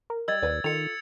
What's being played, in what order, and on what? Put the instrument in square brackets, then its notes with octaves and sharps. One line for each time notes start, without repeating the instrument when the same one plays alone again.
[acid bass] A#4
[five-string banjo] G3 D#5 [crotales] E6 G#6 A6
[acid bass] D#2 [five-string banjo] B4 D5
[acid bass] D#3 [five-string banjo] F4 A4 [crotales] C#7 F7